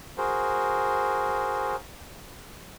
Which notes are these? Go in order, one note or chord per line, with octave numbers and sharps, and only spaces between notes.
F#4 G#4 A#4 C5